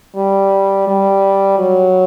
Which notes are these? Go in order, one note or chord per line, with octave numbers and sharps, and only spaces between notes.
G3
G3
F#3